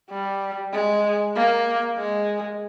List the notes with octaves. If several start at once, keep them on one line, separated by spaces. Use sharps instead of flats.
G3
G#3
A#3
G#3